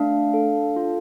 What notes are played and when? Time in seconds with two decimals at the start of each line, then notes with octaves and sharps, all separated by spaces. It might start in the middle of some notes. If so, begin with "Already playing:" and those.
Already playing: A3 D4 F5
0.34 A4
0.76 F4